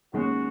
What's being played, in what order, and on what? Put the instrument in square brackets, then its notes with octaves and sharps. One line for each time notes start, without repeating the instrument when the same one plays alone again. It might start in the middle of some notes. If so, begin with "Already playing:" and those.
[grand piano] D#2 D#3 G#3 C#4 [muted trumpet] F#4